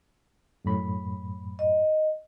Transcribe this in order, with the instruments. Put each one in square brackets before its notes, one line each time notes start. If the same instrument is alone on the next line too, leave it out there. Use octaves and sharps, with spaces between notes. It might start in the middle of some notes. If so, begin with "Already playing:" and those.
[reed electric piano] F#2 A2 B5
[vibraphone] D#5